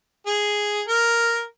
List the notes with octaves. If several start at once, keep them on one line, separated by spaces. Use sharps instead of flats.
G#4
A#4